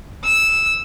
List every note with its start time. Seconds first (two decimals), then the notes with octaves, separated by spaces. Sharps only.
0.24 E6